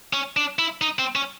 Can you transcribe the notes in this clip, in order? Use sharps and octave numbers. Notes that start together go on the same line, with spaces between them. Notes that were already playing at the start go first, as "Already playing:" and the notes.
C#4
D4
E4
D#4
C4
C#4